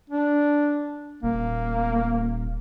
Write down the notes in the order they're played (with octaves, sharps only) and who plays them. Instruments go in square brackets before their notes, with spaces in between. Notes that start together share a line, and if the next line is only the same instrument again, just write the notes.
[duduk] D4
[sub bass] D#1 [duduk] A#3